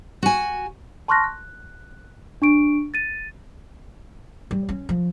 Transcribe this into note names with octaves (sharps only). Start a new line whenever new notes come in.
F#4 G#5
A5 C6 C#6 F6 F#6 A#6
F#6
D4 C#6 D7
A6 D#7
G3
C#4
F3